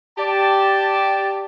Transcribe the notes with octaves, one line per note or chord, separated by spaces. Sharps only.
G4 D5 A5